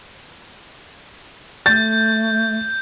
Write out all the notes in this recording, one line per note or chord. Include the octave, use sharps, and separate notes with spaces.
A3 G6 A6